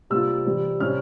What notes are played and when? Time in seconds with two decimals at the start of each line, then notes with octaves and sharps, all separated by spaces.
0.10 C3 G3 A#3 F4 E6
0.46 C3 E3 G3
0.80 C3 G3 C#4 E4 F6